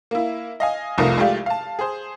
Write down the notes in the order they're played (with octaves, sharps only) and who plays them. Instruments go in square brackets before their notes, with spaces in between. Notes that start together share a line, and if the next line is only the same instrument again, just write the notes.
[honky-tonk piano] A#3 E4
D#5 F5 G#5
F1 C2 F3 A3 D#4 A#4
G#3 A3 F4 G4 D5 F5
F5 A5
G#4 C5